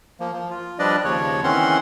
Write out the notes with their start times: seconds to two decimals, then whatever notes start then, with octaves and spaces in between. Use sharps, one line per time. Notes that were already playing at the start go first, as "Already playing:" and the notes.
0.20 F3 A#3
0.33 F3
0.50 F4
0.79 F3 G3 D4 B4 D5 D#5
1.04 D#2 C#3 F3 C#5
1.44 D#3 E3 C4 C#4 F#5 C6